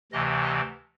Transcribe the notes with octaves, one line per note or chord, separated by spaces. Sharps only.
D2 C3 E3 D#5
D#5